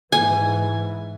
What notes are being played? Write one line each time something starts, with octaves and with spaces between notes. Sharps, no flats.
G#2 E3 G#5